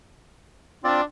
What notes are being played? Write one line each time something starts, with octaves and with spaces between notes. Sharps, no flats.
C4 D4 F4 D5